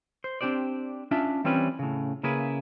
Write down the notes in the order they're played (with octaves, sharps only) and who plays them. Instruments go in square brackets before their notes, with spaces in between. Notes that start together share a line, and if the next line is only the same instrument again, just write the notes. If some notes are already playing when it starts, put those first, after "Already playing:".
[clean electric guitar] C5
C4 D4 G4 C5 D5
C#4 D4 F4 E5
E3 G3 C4 C#4 B4
A2 C#3
C#3 A#3 E4 G#4 B4